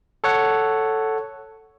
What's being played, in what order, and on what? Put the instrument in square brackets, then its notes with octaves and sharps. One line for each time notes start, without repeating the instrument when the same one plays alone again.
[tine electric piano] A4 C#5 F#5